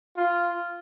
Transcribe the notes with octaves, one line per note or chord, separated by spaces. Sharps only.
F4